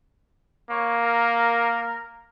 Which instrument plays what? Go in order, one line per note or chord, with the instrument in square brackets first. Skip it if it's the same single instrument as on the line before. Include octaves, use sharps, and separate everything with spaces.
[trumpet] A#3 [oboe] C#5
[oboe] A#4